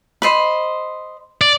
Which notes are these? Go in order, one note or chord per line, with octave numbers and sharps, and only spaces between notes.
C5 D#5 B5
D5